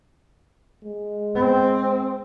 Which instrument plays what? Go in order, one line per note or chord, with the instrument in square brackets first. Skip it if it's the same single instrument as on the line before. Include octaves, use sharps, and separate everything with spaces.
[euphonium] G#3
[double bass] C4